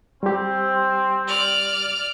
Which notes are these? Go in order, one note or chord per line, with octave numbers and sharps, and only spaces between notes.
G3 C4 G4
D5 F6